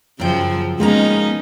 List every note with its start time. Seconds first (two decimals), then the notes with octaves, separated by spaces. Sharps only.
0.19 F#2 C#3 F3 F#3 G5
0.80 F3 G#3 A#3 B3 C#4 D#4 A#5